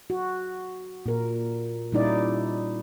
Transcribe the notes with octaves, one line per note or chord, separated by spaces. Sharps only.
F#4
A#2 A#4
A#2 G3 C#4 D#4 E4 D5